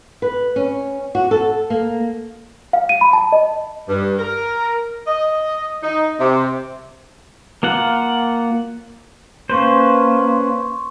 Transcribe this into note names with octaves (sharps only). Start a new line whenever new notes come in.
B4
C#4
F#4
A4
A#3
F5
D#7
B5
A5
D#5
G2
A#4
D#5
D#4
C3
A#3 F4 F#5
A#3 C#4 B4 C5 C6 C#6